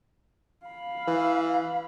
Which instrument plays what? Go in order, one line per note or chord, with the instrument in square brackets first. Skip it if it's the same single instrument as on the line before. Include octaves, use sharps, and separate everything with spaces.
[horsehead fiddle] F5 B5
[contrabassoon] E3